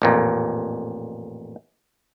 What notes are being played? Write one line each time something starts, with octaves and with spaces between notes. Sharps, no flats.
A1 F2 A#2